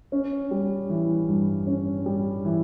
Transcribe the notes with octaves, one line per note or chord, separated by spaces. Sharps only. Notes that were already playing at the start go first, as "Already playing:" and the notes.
C#4
G3
E3
G2
C#4
G3
E3